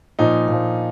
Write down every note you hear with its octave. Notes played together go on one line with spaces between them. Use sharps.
A#2 F3 D#4
A#2 F3